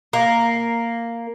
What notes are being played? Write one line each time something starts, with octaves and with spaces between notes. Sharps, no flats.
A#3